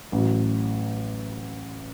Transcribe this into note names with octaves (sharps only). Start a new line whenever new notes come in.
A1 A2 F#3